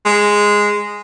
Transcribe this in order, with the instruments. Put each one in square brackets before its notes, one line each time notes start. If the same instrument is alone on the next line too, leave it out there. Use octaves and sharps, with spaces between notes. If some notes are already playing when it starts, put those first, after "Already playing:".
[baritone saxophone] G#3